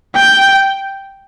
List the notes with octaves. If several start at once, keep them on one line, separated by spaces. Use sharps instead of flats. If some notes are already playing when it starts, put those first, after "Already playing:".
G5